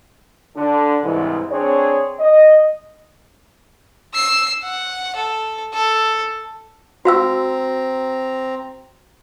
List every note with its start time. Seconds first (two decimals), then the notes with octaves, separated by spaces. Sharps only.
0.57 D3 D4
1.04 C2 G#2 E3
1.51 C4 D4 G#4 C#5
2.20 D#5
4.14 E6 C7
4.63 F#5
5.16 A4
5.74 A4
7.05 C4 F#4 F5 A#5 E6